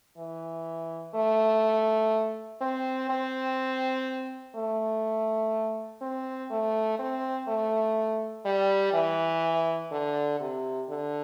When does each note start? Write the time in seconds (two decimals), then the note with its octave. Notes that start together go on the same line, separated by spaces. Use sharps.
0.18 E3
1.15 A3
2.61 C4
3.10 C4
4.56 A3
6.02 C4
6.51 A3
6.99 C4
7.48 A3
8.45 G3
8.93 E3
9.92 D3
10.40 C3
10.89 D3